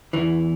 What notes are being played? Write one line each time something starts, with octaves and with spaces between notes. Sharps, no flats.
E2 E3